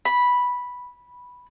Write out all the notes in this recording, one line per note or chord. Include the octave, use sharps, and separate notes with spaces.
B5